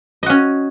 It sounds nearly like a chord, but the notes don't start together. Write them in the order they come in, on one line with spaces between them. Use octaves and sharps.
D#5 F#4 C#4